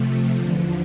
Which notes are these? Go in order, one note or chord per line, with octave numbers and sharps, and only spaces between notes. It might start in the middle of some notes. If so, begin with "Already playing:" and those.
Already playing: C3 F3 A3
E2 D3 F3